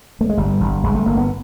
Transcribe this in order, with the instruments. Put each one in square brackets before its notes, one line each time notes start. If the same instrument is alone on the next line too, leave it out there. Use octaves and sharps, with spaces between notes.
[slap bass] A3
G#3
G1 G3
G1
G1 G#3
A3
G1 A#3
B3